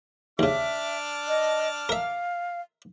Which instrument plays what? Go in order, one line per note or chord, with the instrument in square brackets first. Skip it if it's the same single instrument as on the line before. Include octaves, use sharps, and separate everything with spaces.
[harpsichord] D#2 C#3 [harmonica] D4 D6 F6 [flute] E5
[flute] D#5
[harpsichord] A#4 E5 [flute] F5